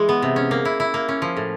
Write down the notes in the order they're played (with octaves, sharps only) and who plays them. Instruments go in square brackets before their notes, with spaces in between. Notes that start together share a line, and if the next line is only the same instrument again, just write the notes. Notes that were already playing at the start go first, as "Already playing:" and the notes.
Already playing: [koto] E3 G#3
B3
C3
C#4
A#3
E4
E4
A#3
C#4
F3
A2